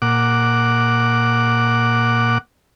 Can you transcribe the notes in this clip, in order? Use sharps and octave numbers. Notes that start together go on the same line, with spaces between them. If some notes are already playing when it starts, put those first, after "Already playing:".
A#2 F#5 D6